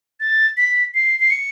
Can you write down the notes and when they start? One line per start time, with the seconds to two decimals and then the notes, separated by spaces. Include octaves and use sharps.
0.20 A6
0.57 B6
0.94 C7
1.20 C7
1.30 C#7